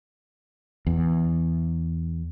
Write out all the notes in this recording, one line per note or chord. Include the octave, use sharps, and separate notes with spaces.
E2